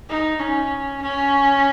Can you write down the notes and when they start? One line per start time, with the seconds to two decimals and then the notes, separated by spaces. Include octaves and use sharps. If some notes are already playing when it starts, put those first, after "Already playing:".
0.09 D#4
0.40 C#4
1.02 C#4